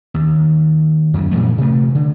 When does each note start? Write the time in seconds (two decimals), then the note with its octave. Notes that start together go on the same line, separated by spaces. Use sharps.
0.14 D#2
1.14 F#2 D3
1.31 A#2 E3 F3 A3
1.58 C3 A3
1.95 D3